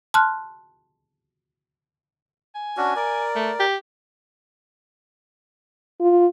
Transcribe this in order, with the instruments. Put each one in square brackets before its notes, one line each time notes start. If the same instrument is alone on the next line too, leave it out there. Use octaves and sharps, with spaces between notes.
[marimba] A5 C6 F6 F#6
[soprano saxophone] G#5
[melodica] C#4 D4 F#4
A#4 D5
[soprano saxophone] A3
G4
[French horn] F4